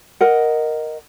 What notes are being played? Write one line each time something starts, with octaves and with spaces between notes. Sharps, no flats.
A#4 D#5 F#5